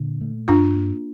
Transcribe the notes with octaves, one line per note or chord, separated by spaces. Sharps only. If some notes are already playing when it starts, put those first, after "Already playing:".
Already playing: A#2 D3
A3
G2 D4 F4
A#3